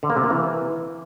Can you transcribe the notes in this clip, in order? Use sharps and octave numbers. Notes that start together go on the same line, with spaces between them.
D3
A#3
C3
A#3
E3